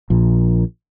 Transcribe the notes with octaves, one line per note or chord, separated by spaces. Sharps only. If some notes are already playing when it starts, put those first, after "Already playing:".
A#1 A#2